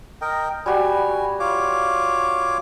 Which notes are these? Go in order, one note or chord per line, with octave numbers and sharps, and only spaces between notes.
A#4 D#5 G5
G3 F#4 G4 G#5
F4 C#5 D6